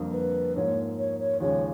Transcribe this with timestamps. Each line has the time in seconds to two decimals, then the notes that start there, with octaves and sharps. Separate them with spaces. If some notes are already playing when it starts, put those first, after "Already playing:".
Already playing: F2 D3 G3 A#3
0.13 B4
0.56 G#2 F3 A#3 C#5
0.98 C#5
1.20 C#5
1.40 D#2 C#3 F3 G#3 C#5